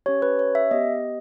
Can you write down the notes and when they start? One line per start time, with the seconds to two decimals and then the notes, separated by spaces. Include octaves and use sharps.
0.06 C#4 G4 C#5
0.22 B4
0.39 C#5
0.55 E5
0.71 B3 G4 D#5